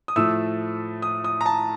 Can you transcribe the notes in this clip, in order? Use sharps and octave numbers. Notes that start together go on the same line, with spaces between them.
D#6
A2 F3 A3 E6
D#6
D#6
A#5
A5